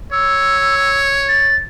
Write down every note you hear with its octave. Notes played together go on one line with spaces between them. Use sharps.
C#5 E6
A6